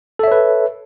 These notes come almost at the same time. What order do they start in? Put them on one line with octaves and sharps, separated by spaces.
A4 E5 C#5 B4